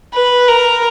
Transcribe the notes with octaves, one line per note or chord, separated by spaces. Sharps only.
B4
A#4